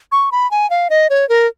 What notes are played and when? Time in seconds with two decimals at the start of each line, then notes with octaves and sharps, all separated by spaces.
0.12 C#6
0.32 B5
0.51 G#5
0.70 F5
0.90 D#5
1.10 C#5
1.29 A#4